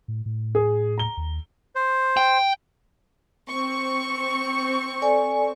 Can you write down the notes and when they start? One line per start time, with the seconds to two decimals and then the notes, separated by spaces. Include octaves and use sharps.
0.08 A2
0.26 A2
0.55 G#4
0.98 A#5 G7
1.17 D#2
1.76 C5
2.17 G5
3.49 C4 C#6
5.02 A4 D5 G#5